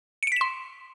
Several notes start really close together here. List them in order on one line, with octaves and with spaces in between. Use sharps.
C#7 D7 B6 E7 C6